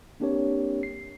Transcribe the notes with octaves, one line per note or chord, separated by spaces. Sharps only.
A#3 C4 D4 G4 A#4 C#5
C7